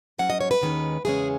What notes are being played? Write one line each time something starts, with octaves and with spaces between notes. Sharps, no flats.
G#2 F#3 C#4 F#5
D#5
C#5
B4
D#2 D#3 G#3 C#4
E2 C#3 G#3 C#4 G#4